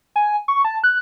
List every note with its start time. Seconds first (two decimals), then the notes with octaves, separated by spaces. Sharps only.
0.16 G#5
0.48 C#6
0.65 A5
0.84 F#6